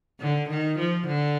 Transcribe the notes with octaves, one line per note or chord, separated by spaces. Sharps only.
D3
D#3
F3
D3